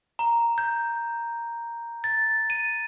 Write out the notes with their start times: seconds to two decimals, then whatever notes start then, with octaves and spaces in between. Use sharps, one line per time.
0.19 A#5
0.58 G6
2.04 A6
2.50 D#7